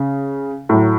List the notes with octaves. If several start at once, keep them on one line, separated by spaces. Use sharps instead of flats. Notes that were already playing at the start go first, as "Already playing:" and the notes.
Already playing: C#3
A2 F#3